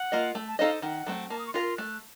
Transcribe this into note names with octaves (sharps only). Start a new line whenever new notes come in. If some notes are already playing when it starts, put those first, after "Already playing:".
Already playing: F#5
A#3 F4 A#4 D#5
A3
A5
D#4 A4 C5 D#5 F5
D#3 F#5
F#3 A3 C4
A#3 A5
D#6
C#6
F4 A#4 C6
A3 F#6